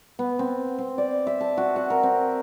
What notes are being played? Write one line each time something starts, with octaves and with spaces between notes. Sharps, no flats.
B3
C4
C4
D5
E5
A5
F#4
F#5
A#4
C4